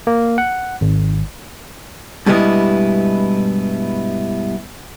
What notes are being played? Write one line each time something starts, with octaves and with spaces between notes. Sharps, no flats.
A#3
F#5
G#1
G2 B2 G3 G#3 B3 E4